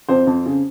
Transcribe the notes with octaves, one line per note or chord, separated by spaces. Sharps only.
F2 C4 C5
F2
C#3